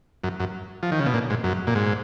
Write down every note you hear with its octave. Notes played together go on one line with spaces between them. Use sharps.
F#2
F#2
F3
D#3
C#3
B2
A#2
G#2
F#2
A#2
G#2